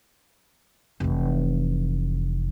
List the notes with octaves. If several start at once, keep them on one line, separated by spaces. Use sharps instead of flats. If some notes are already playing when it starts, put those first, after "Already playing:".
F1 E3